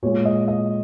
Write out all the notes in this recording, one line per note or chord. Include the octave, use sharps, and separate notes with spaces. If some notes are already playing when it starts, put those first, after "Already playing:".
A#2 G#3 C#5
D#5
D#5